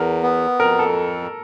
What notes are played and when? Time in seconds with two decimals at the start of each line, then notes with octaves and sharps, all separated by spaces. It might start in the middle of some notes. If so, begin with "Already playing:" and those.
Already playing: E2 A#4
0.23 B3
0.60 F2 A#4
0.79 A4